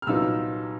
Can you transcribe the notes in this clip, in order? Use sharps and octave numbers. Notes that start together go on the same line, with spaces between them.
F6
C2 A#2 F#3 B3 D#4 E6